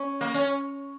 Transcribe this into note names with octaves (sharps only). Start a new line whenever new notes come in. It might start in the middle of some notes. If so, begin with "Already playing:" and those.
Already playing: C#4
A#3
C#4